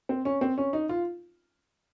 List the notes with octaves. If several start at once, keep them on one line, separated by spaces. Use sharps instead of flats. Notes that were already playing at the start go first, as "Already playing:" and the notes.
C4
C#4
C4
C#4
D#4
F4